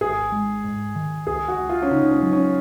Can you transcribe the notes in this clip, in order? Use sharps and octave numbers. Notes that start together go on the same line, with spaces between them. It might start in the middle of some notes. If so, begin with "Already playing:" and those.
G#1 G#4
G#3
G#2
D#3
C#2 G#4
F#4
C#2
F4
C#4
C#3 D#4
C#4
F#3
C#4